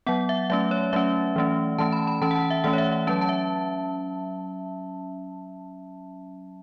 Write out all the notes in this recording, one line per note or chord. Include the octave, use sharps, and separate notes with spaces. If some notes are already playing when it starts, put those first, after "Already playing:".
F#3 B3 F#5
E5
F#3 A3 C#4 E5
C#5
F#3 A3 C#4 E5
E3 A3 C#4
E3 A3 C#4 A5
B5
B5
E3 C#4 A5
F#5
A5
E5
E3 A3 C#4 F#5
C#5
E5
E5
F#3 C#4 A5
A5
E5